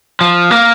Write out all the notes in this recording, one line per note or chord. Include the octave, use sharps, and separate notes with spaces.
F3
A#3